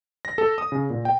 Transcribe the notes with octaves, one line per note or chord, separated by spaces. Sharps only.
A#6
A4
D#6
C#3
A#2
G5